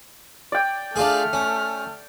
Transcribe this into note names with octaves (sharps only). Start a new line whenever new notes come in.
D5 G5
A3 D4 F4 G#4 F6
C#4